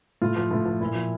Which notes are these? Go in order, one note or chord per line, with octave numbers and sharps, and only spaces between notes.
A2 F4
F3
A2
F3
A#2 E4
F3